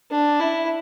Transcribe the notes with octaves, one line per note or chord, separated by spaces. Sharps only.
D4
E4